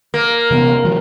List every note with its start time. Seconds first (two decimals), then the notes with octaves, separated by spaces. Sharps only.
0.14 A#3
0.51 C3 E3 B3
0.85 E3 F#3